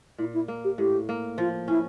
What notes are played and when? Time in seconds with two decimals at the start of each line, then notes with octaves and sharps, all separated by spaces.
0.18 A#2 E4
0.33 E4
0.48 A#3
0.64 G4
0.78 A2 G4
1.09 A#3
1.38 F3 F4
1.68 C#4 E4